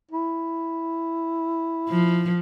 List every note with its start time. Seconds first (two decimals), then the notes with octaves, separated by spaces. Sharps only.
0.11 E4
1.89 F3